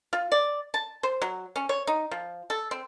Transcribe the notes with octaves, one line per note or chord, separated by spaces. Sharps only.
F4
D5
A5
C5
F#3
C#4
C#5
D#4
F3
A4
C4